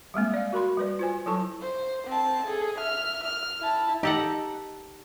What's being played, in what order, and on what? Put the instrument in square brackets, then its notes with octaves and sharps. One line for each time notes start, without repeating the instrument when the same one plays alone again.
[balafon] G3 G#3 A#3 C4
D5 F5
F#4 A#4 B5 C6
G3 B4 D5
F4 C5 G#5
F#3 E4 A4 A5 C#6
[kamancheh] C5
C4 A5
G#4 A4
E5 F6
F6
E4 A5
[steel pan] D#4 D#5 A#5 [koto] G4 A4 F#5